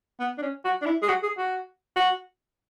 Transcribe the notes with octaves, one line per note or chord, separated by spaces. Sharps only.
B3
D4
C#4
F#4
D4
E4
G#4
F#4
G#4
F#4
F#4